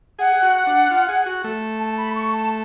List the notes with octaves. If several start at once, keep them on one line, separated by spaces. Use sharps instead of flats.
G#4 F#5
G#4
F#4
D4
F4
G#4
F#4
A3
A5
B5
C#6
A5